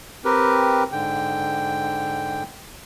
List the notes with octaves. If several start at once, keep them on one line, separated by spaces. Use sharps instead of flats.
C4 G4 A#4 B4
G#2 D3 G5